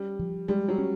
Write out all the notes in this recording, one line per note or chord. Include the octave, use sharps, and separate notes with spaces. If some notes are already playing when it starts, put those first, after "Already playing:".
Already playing: G3 C#4
F3
G3 G#3
F#3
C#4